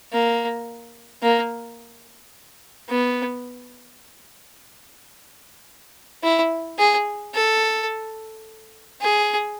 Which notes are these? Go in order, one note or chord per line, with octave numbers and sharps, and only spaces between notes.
A#3
A#3
B3
E4
G#4
A4
G#4